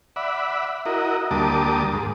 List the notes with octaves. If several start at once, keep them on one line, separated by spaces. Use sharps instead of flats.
D5 E5 F#5 B5
E4 F#4 A#4 D#5
D2 G3 A#3 A5 D6 D#6
G#2